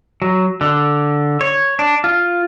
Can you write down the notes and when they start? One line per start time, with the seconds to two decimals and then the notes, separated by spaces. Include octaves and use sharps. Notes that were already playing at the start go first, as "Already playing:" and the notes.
0.22 F#3
0.61 D3
1.41 C#5
1.79 D4
2.04 F4